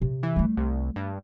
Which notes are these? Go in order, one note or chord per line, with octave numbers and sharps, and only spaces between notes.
C3
E3
G3 A3
C2
G2